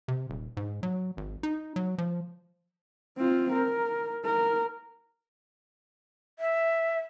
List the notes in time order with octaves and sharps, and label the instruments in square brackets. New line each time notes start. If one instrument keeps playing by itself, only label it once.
[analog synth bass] C3
D#1
G#2
F#3
G#1
D#4
F#3
F3
[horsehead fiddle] C4 F4
A#4
A#4
[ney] E5